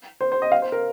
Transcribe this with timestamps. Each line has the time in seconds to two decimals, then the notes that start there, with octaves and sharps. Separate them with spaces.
0.21 C5
0.32 C5
0.42 D#5
0.52 F5
0.62 C5
0.72 A#4